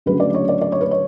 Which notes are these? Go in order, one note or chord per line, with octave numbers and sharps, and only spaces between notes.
D2 C#3 F#3 B4
D5
C#5
D5
D5
C#5
B4
C#5